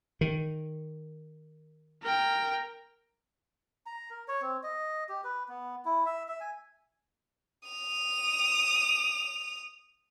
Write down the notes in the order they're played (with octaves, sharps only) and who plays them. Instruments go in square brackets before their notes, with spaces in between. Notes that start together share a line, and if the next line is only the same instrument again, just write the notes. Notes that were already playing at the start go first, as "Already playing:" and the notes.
[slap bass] D#3
[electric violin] A#4 G5
[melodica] A#5
A#4
C#5
C4
D#5
G4
B4
B3
E4
E5
E5
G#5
[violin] D#6 F7